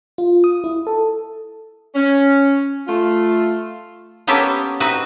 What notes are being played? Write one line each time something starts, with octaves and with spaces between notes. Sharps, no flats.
F4
D#6
E4
A4
C#4
A3 F4
A#3 B3 C#4 G4 A4 C5
C4 D#4 F#4 B4